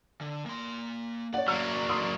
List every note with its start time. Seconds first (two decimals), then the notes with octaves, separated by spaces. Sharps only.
0.21 D3
0.46 A#3 C6
1.34 C#5 D5 F#5
1.48 F#3 A#3 F6
1.89 C6 D#6